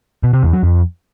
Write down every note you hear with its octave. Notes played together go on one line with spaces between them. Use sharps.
B2
C3
E2
F#3
F2